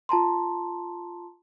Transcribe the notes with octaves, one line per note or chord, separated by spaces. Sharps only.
F4 A5 A#5 C6